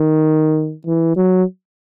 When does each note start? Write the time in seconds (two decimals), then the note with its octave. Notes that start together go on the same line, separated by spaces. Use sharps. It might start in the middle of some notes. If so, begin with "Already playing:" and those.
Already playing: D#3
0.86 E3
1.17 F#3